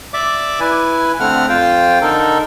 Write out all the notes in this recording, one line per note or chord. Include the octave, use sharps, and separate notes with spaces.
D5 E5 D6
E4 B4 G#5
D3 A3 C4 F#5 F6
F2 F4 C5 F5 G5
D3 D#4 A4 A#4